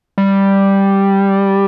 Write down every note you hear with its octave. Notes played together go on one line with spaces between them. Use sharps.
G3